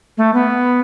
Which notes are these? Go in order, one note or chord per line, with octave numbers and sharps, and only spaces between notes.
A3
B3